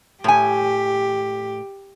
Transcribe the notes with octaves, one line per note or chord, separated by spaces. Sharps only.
A2 G4 G#5